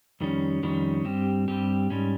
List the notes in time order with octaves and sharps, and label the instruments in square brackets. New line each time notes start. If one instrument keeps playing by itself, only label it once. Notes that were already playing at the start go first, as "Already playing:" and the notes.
[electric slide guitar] F2 D#3 G3 C#4
F2 D#3 G3 C#4
G2 G3 C4 G4
G2 G3 C4 G4
G#2 G3 C#4